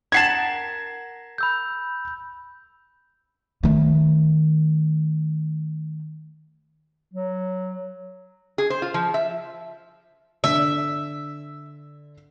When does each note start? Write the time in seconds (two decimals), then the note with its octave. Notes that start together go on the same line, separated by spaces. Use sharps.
0.12 A#4 F#5 A5 G#6 C7 E7
1.38 B5 E6 G6
3.63 D#3 A3
7.13 F#3
8.58 G#4
8.70 C5
8.82 F4
8.94 F3
9.14 E5
10.44 D3 E5 B6